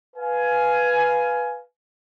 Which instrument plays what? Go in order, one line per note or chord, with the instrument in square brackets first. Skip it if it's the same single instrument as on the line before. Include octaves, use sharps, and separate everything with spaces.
[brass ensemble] B4 F5 G#5